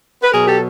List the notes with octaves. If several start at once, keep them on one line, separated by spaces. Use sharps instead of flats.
B4
B2 F#3 G#4 A#4
G4 A4